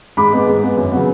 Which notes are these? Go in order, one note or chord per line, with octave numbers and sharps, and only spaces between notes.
G#2 B5 D6
G#3 B3
G#2
G#3 B3
F#2
C#3 F#3 B3